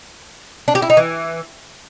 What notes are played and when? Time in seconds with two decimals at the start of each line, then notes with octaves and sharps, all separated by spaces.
0.68 D4
0.75 G4
0.82 E4
0.90 D#4
0.97 E3